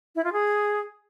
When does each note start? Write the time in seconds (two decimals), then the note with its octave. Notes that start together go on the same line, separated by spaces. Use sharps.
0.16 E4
0.24 F4
0.33 G#4